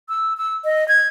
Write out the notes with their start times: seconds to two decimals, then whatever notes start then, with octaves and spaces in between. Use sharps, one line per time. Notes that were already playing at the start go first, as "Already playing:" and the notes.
0.09 E6
0.37 E6
0.65 D#5
0.88 G#6